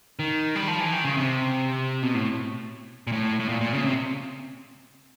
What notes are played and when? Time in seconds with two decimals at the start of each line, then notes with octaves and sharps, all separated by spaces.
0.19 D#3
0.56 G3
0.68 F3
0.80 E3
0.93 D#3
1.05 C#3
1.17 C3
2.03 B2
2.14 A2
3.07 A#2
3.12 A2
3.40 A2
3.49 A#2
3.61 A#2
3.74 C#3
3.85 C3